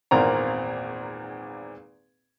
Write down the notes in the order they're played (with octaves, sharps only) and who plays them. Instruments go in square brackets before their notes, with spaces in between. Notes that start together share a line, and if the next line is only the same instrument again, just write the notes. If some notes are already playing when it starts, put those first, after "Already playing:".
[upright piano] G#1 E2 A#2 A#3 C4 A#5